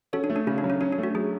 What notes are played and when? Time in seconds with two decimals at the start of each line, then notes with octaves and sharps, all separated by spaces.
0.13 C#4 F#4 A4
0.24 D4
0.30 A3
0.36 D4
0.47 C#3 C#4
0.58 D4
0.64 F#3
0.70 C#4
0.81 C#4 D4
0.93 D4
0.98 A3
1.03 F#4
1.15 F#3 G#4